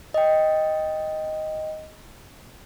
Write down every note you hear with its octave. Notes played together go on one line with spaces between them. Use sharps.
D#5 G5